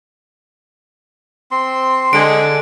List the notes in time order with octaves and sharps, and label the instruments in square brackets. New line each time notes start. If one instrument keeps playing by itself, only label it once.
[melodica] C4 C6
[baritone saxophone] D3 [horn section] G#3 [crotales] D7